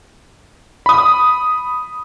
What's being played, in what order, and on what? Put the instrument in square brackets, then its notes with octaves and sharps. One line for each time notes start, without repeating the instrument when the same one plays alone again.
[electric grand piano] B5 D#6